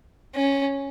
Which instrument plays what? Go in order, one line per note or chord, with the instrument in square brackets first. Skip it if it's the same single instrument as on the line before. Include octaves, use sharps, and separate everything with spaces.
[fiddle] C#4